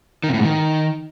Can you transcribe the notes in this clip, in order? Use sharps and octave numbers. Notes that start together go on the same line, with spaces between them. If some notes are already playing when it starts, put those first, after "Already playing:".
D#3
C3
A2
G#2
D#3